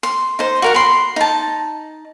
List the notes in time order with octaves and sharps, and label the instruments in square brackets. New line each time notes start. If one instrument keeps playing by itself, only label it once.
[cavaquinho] C6
D#4 C5
F#4 A#4 F#5
B5 C6
D#4 A5